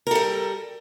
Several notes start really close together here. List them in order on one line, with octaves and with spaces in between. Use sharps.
A#4 A4 G3